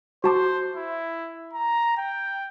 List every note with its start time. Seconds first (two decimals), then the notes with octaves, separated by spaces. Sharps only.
0.24 F#4 C5 A5 D6
0.76 E4
1.53 A#5
1.97 G5